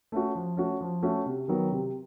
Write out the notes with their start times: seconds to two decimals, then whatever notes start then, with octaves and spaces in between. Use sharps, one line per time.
0.12 A3 C#4 F#4
0.35 F3
0.57 A3 C#4 F#4
0.81 F3
1.02 A3 C#4 F#4
1.26 C3
1.48 D#3 F#3 B3
1.71 C3